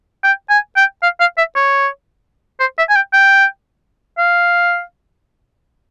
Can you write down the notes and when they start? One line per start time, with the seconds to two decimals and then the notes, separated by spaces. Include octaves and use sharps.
0.24 G5
0.50 G#5
0.76 G5
1.03 F5
1.20 F5
1.38 E5
1.56 C#5
2.60 C5
2.78 E5
2.90 G#5
2.96 G5
3.13 G5
4.18 F5